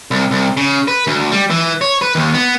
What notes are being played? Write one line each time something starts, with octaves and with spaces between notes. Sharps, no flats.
C2
C2
C#3
B4
D2
G3
E3
C#5
B4
D#2
B3